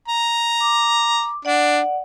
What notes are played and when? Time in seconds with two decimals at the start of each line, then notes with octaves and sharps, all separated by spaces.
0.08 A#5
0.60 D6
1.45 D4 D5 F#5